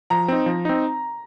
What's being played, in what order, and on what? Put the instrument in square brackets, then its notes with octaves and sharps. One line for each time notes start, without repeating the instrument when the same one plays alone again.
[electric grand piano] F3 [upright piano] A#5
[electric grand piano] C4 D#4
F3
C4 D#4